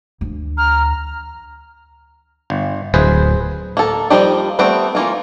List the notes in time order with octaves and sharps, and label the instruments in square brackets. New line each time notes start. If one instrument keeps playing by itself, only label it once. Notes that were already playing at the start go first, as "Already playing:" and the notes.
[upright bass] D2 E3
[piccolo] A#5 [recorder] F6
[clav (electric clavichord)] G1
[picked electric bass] D1 [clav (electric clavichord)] G#4 B4 C5
[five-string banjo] A#3 A4
F3 G3 A#3 D#4 G4
G3 A3 B3 C4 G4
E3 A#3 F4